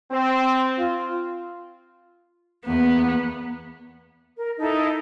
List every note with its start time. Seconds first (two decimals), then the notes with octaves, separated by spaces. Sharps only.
0.11 C4
0.79 F4
2.66 E2 A#3 B3
4.37 A#4
4.58 D#4 E4 A4